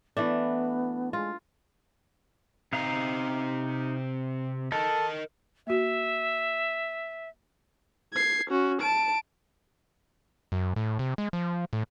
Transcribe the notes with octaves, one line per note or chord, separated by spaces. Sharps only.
E3 A3 B3 D4
G#3 F4
C3 C4 D#4 F5 A#5
A4 A#4 D#5
A#3 F#4 E5
G#6 C7
C#4 F#4
A5 D7
F#2
A2
C3
G#3
F3
A2